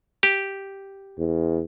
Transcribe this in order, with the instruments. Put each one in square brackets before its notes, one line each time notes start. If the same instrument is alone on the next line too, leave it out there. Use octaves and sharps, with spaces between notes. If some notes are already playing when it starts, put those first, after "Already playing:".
[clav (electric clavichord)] G4
[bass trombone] E2